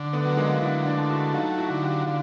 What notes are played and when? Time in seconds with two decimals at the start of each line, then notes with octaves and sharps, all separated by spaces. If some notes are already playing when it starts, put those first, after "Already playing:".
Already playing: D3
0.13 A3 B3
0.25 F#3
0.37 G#3 A#3
0.53 F4
0.61 D3 D4 E4
0.85 D4 E4
0.98 A3
1.10 E4 F#4
1.34 F#3 D#4 F4
1.58 E4 F#4
1.70 D3
1.83 F4 G4
2.06 D3 F4